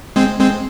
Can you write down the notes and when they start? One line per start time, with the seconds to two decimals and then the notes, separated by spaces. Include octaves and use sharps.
0.16 G#3 C4
0.40 G#3 C4